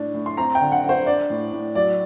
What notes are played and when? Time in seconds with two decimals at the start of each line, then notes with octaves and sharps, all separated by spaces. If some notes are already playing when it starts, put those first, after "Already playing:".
Already playing: A2 D4
0.14 A2
0.26 C6
0.37 C4 A#5
0.55 G5
0.60 D3
0.72 F#5
0.83 C4
0.89 C5
1.06 D4 D5
1.30 A2
1.52 A2
1.75 F#3 D5